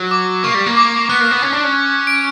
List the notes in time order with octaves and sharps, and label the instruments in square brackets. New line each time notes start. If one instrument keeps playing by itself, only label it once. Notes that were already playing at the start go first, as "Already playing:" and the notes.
Already playing: [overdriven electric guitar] F#3
[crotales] D6
[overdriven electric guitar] A#3 [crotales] C#6
[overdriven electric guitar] G3
A#3
[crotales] D6
[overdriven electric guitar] B3 [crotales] F#6
[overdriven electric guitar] A#3
B3
C#4
D4
C#4
[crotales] D7